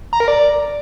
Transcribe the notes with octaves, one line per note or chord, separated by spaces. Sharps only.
A#5
A#4
D5